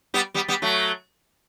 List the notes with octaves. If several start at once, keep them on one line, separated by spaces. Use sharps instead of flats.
G3 B3
G3 B3
G3 B3
F#3 A3